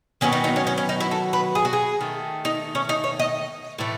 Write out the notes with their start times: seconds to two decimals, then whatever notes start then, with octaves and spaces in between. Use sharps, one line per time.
0.21 D#3 F#3 B3 C#4
0.32 D#4
0.44 D#4
0.56 C#4
0.67 C#4
0.78 C#4
0.89 D#4
1.00 E4
1.11 A4
1.33 B4
1.55 G#4
1.65 F#4
1.73 G#4
2.01 D#3 A3
2.45 D#4
2.75 C#4
2.89 D#4
3.04 C#5
3.20 D#5
3.78 A2 E3 A3